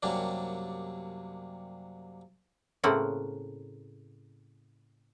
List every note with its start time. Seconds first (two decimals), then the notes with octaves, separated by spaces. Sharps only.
0.03 F#2 C3 G3 A#3 D4
2.84 A2 C#3 A#3 C4 F#5